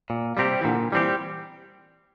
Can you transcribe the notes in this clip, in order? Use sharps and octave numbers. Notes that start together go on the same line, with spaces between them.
A#2
C3 G3 C4 G4
E3
A#2 D3
E3 G3 C4 G4